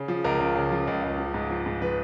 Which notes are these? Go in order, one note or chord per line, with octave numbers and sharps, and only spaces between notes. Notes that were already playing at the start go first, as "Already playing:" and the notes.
Already playing: C#3
F3
C#2 A#4
C#2
C#3
F3
C#2
C#2
F3
G#2
F3
G#2
F3 B4